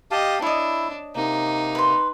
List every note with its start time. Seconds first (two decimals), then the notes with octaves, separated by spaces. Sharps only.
0.11 G4 D#5 F5 A5
0.42 D4 E4 C#5 D#5
1.16 C3 A#3 D#4
1.75 B4 C6